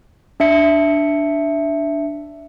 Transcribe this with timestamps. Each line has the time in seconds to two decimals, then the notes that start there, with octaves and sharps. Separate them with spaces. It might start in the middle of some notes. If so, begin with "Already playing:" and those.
0.40 D4 E5 C#7